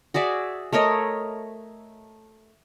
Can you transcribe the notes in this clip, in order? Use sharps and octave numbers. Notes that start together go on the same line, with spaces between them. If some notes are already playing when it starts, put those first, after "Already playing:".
F#4 G#4 D5 E5
A3 A#4 C#5 D#5